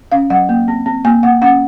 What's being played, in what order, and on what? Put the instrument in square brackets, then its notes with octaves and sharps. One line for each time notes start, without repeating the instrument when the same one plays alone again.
[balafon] C#4 F5
F#3 F#5
A#3
C4
C4
A#3 G#5
A#3 F#5
C#4 F#5